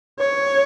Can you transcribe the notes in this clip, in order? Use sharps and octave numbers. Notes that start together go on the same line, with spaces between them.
C#5